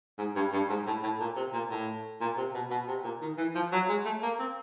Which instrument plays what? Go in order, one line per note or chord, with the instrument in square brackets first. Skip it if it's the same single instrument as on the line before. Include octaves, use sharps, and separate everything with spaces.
[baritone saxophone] G#2
G2
G2
G#2
A2
A2
A#2
C3
A#2
A2
A#2
C3
B2
B2
C3
A#2
D#3
E3
F3
F#3
G#3
A3
A#3
C4